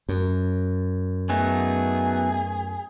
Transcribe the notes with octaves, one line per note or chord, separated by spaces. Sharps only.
F#2
F#3 A3 B3 D#4 G#4